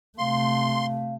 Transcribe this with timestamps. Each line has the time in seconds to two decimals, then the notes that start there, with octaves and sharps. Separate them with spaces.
0.18 C3 A3 F5 C6